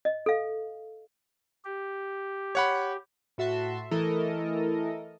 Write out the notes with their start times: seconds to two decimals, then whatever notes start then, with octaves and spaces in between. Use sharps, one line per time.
0.05 D#5
0.26 A4 F5
1.64 G4
2.55 C#5 F#5 B5
3.38 A2 F#4 E5 A5 C6
3.91 E3 A3 E4 A4 A#4 D#5